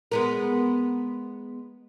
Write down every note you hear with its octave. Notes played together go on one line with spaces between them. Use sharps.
G#3 B3 A#4